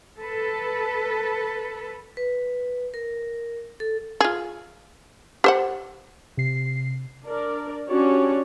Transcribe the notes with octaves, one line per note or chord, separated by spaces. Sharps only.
A4 B4
B4
A#4
A4
F4 G#4
G4 C5 F#5
C3 C7
D4 A#4 D5
C#4 D4 F#4 G4 C#5 D5